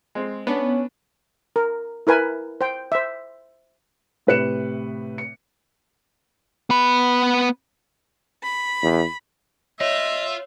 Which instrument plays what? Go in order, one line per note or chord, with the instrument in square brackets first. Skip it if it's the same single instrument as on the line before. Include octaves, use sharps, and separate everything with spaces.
[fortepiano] G#3 C4
[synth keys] B3 [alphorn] C#4 [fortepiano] D4 B4
[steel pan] A#4
E4 A#4 B4 G#5
C5 G5
C5 E5
[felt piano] A2 C3 B4 F#6 C#7 E7
C#7
[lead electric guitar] B3 B5
[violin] B5
[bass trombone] E2
[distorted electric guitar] F4 [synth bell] C#5 [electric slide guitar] D#5 [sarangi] E5